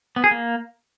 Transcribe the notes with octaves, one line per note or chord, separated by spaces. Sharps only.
B3
G#4
A#3